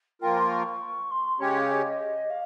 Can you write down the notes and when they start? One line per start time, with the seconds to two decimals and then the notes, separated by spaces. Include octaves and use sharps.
0.21 F3 A#3 F4 A#4 G5
0.37 C6
0.51 C#6
1.11 C6
1.40 C#3 G#3 C#4 G4 C#5 G5
1.56 F5
1.71 D#5
2.30 F5